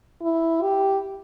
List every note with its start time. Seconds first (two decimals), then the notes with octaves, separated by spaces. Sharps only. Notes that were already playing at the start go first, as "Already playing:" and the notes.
0.22 E4
0.62 G4